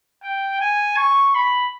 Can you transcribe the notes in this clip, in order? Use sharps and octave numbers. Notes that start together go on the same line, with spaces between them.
G5
G#5
C#6
B5